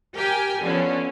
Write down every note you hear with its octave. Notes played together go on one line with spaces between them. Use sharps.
G4 A#4 G5 G#5
D3 F3 B3 C#4